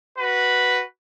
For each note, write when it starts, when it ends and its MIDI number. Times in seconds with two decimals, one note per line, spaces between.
0.17 0.82 66
0.17 0.82 71